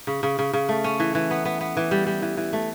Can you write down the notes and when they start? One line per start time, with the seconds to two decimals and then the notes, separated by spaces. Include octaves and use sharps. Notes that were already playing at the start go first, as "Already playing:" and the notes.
0.07 C#3
0.23 C#3
0.39 C#3
0.53 C#3
0.69 A3
0.84 C#4
1.00 E3
1.15 E3
1.31 B3
1.45 B3
1.61 B3
1.77 E3
1.91 G3
2.06 G3
2.22 E3
2.37 E3
2.53 A3